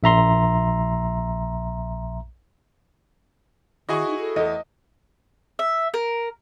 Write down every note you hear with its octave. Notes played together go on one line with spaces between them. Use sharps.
A#1 E5 A#5 C6
D#3 E4 F#4 G#4 D#5 C#6
D#4
A4
E2 A3 D#5
E5
A#4